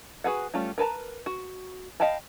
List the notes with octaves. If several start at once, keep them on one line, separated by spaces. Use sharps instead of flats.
F#4 G#4 B4 F#5
G3 A3 C#4 F4
A#4 B4 A5 A#5
F#4
D#5 F5 G5 A5 B5